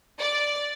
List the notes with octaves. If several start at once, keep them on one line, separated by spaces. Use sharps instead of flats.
D5